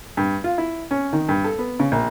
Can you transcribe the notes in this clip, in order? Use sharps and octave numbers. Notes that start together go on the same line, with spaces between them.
G2
F4
E4
C#4
D#3
G2
A4
B3
C#3
A#1